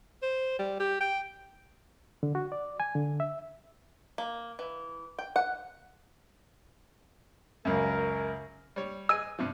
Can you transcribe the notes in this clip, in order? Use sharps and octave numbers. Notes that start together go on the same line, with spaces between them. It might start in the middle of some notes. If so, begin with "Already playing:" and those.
C5
G3
G4
G5
D3
F#4
D5
G#5
D3
E5
A#3
E3
G5
F#5
C#2 F#2 A#4
G3 C#5
G#4 D#5 G#5 E6 D#7
G2 C3 F3